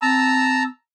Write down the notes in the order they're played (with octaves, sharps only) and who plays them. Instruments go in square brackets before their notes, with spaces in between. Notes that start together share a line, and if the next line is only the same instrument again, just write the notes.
[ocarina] C4 [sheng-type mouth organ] A5 A#5 E6